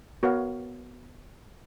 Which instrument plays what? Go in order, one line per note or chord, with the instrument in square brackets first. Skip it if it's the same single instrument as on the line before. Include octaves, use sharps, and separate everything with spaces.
[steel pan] B3 F#4 A#4 C#5 F5